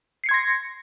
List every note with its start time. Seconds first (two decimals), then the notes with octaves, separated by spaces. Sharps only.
0.24 C7
0.26 C#7
0.29 G#6
0.31 C6
0.34 A#6